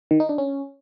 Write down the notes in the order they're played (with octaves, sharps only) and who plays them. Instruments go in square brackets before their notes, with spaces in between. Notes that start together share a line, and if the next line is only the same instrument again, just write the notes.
[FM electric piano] D#3
D#4
D4
C#4